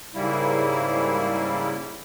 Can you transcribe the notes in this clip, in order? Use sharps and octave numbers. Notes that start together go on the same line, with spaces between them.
G#2 C#3 G3 A#3 E4